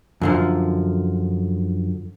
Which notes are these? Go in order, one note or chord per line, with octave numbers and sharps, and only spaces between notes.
F#2 D3 F3